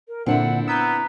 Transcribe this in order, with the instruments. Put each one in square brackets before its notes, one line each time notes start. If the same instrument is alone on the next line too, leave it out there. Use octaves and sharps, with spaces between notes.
[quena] A#4
[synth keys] A#2 D3 [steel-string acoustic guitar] C4 D4 E4 [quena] F#5
[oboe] B3 [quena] A#5 [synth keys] E6 G6